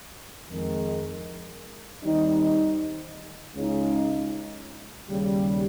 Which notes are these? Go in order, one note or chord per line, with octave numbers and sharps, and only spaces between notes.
F2 D#3 G#3
D#2 D#3 G3 C4 D#4
C#2 C#3 G#3 D#4
D#2 C#3 G3